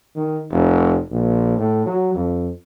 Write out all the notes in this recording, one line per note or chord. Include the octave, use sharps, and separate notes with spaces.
D#3
F1
A#1
A2
F#3
F2